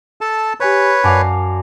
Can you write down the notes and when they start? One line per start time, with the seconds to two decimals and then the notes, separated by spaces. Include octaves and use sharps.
0.21 A4 A5
0.60 G4 B4 C#5 G#5 B5
1.04 F#2 D5 F5 G#5 A5 D6